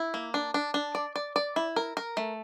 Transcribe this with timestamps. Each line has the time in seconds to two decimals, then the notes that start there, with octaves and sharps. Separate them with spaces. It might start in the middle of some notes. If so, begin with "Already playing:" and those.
Already playing: E4
0.14 A#3
0.34 D4
0.54 D4
0.74 D4
0.95 D5
1.16 D5
1.36 D5
1.56 E4
1.76 A#4
1.97 A#4
2.17 A3